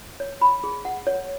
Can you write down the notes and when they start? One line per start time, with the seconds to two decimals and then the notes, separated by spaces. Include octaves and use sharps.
0.20 C#5
0.42 B5
0.64 G#4
0.85 F#5
1.07 C#5